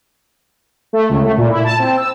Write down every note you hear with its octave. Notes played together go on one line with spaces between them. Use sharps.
A3
C#2
A3
A#2
E4
A5
C4
E6